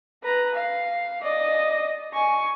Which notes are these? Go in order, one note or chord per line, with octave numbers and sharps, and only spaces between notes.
B4 A#5
F5
D5 D#5
G#5 C#6